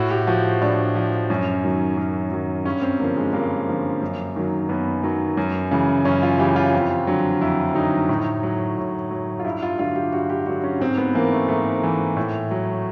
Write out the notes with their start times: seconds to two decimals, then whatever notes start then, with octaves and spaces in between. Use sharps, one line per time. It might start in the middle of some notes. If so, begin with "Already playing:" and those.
Already playing: A2 F#4
0.10 G4
0.27 F3 F#4
0.61 A2 D4
0.95 F3
1.30 F#2 C#4
1.64 D#3 F#3
1.97 F#2
2.31 D#3 F#3
2.65 G2 C#4
2.82 C4
3.00 D3 F3 A#3
3.17 G#3
3.33 G2 A#3
3.68 D3 F3
4.01 F#2
4.36 D#3 F#3
4.69 F#2 B3
5.03 D#3 F#3
5.37 F#2
5.71 C#3 E3
6.05 F#2 C#4
6.23 F4
6.39 C#3 E3 G4
6.56 F4
6.73 F2
7.07 D3 F#3
7.41 F2 E4
7.75 D3 F#3 D#4
8.09 A2
8.43 F#3
8.78 A2
9.10 F#3
9.40 F4
9.44 G2 E4
9.63 F4
9.79 D3 F#3 F4
9.96 G4
10.12 G2 F#4
10.30 G4
10.46 D3 F#3 F#4
10.64 C#4
10.80 G#2 C4
10.98 B3
11.15 E3 A#3
11.32 A3
11.48 G#2 A3
11.83 E3
12.17 A2
12.51 F#3